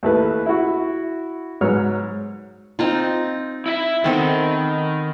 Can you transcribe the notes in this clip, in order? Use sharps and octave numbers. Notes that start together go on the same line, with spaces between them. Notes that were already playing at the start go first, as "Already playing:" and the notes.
D#2 A3 E4 B4
E4 F#4
G#2 F#3 B4 C#5 F6
C4 D#4 F4
E4 D#5 E5
D#3 B3 C4 A4